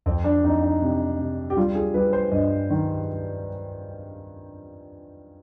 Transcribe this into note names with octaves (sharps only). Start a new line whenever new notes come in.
F2 C4
D4
F2 D#4
D#4
C3
C3
G4
G3 F4
G#4
G3 B4
C5
G2 D#5
D#3